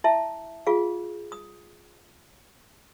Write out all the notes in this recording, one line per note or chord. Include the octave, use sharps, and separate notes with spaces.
E4 E5 A5
F4 G#4 F5
D#6